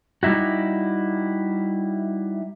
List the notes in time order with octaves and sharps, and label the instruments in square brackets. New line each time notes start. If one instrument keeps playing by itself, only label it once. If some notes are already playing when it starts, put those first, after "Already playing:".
[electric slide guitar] G3 D#4 E4 F#4